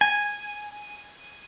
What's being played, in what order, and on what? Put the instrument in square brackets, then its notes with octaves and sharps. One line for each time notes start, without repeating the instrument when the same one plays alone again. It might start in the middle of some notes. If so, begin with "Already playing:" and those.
[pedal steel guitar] G#5